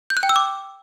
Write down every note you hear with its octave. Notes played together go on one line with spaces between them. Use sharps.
G6
F#6
G5
E6
D6